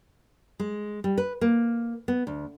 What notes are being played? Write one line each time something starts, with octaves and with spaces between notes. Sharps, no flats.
G#3
G3
B4
A#3
B3
D2